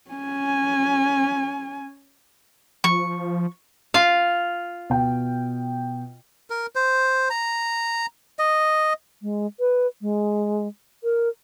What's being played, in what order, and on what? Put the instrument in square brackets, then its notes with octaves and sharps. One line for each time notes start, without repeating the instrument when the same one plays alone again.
[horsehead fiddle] C#4 G#5
[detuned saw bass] F3 [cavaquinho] C#6
[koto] F4 F5
[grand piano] B2 G5
[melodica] A#4
C5
A#5
D#5
[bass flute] G#3
B4
G#3
A#4